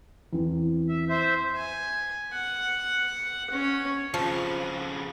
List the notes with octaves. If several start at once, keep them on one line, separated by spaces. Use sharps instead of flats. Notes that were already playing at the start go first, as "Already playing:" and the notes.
E2 C4
E5
C5 E5
G#5
F#5
C#4 C#5
F2 C#3 F3